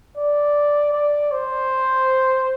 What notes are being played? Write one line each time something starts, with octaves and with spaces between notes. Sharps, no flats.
D5
D5
C5